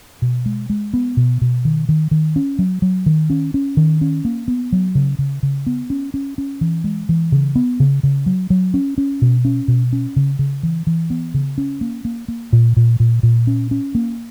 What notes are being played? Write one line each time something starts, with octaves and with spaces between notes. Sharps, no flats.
B2
G#3
G#3
B3
B2
B2
D#3
D#3
D#3
C#4
F#3
F#3
D#3
C#4
C#4
D#3
C#4
A#3
B3
F#3
C#3
C#3
C#3
B3
C#4
C#4
C#4
E3
G#3
E3
C#3
B3
C#3
C#3
F#3
F#3
C#4
C#4
B2
C#4
B2
C#4
C#3
C#3
E3
E3
B3
C#3
C#4
A#3
A#3
A#3
A#2
A#2
A#2
A#2
C#4
C#4
A#3